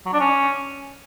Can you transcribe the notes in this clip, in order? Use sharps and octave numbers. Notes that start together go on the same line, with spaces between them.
F#3
D4
C#4